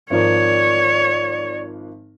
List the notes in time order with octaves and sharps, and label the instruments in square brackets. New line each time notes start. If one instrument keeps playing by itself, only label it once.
[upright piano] G#1 F3 A#4 [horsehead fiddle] C#5 [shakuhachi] D5